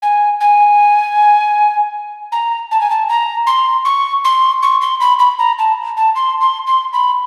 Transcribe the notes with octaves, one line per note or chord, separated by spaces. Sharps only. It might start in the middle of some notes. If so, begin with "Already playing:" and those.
G#5
G#5
A#5
A5
G#5
A5
A#5
C6
C#6
C6
C#6
C6
B5
B5
A#5
A5
A5
C6
C6
C6
B5